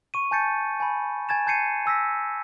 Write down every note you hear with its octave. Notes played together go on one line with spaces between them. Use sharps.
C#6 D#7
G#5 A5 G6 A6 C#7
G#5 B5
G#5 G#6 A6 E7
A5 G6 G#6 C7 C#7 D#7
G#5 E6 A#6 B6